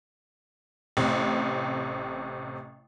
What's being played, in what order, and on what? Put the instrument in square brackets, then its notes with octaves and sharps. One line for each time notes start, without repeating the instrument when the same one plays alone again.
[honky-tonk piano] A1 A2 C3